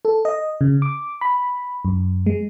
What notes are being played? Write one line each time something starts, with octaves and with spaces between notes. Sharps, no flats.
A4
D#5
C#3
D6
B5
F#2
G#3